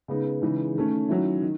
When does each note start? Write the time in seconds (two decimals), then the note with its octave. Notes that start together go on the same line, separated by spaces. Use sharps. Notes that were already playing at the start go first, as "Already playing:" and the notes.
0.08 C#3 G#3 B3 D#4
0.42 C#3 E3 G#3 D#4
0.75 D#3 A3 C#4
1.09 D#3 F#3 C#4 E4
1.42 D#3